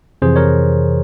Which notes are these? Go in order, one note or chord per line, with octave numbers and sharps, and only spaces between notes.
F2 C3 E3 G#4 C5
A#4 C#5